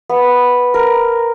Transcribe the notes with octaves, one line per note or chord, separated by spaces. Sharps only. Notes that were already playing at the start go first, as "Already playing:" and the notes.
B3
A#4